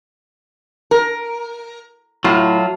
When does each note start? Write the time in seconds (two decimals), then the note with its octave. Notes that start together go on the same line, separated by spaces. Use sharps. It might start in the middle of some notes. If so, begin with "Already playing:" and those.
0.91 A#4
2.24 A2 F#3 F4